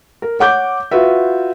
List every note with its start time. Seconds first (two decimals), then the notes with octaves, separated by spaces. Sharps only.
0.22 A#4
0.39 C#5 F#5 D6 G6
0.91 F4 F#4 B4 E5